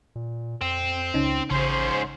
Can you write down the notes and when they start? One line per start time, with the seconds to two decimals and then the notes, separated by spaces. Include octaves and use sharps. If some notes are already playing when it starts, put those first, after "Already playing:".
0.16 A#2
0.61 F2 C4
1.14 C#2 C#3 C#4 D#4
1.51 A1 G#2 C#3 C#4 C5 C6